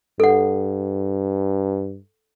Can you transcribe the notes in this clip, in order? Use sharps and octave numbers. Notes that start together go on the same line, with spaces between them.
G2 A4 F#5